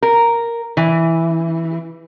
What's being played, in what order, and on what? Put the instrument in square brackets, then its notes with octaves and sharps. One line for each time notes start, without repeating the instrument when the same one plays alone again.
[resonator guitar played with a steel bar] A#4
E3